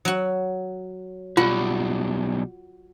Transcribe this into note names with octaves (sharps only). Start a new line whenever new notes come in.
F#3 F#4
B1 G3 F4 F#4